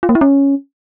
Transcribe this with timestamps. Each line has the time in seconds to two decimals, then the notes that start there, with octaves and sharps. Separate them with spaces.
0.03 F4
0.09 A#3
0.15 E4
0.21 C#4